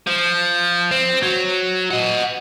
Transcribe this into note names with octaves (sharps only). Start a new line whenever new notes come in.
F3
C4
F#3
D#5 F#5